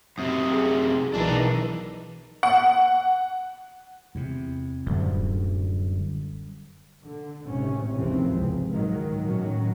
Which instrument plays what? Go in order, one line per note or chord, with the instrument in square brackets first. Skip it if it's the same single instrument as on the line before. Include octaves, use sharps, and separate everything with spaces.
[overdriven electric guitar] F#2 C3 [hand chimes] C4 D#6
[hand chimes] G#4
[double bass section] B1 D#3 E3 [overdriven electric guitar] D4 D#4
[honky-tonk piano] F#5
[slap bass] E2 C3
[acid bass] D1 [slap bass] F#2 D3 G3
[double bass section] D3
G#1 A2 C3 C#4
G#1 D#2 C3 E3 F3 C4
C#2
G#2 D#3 F#3
A2 D#3 F#3 C#4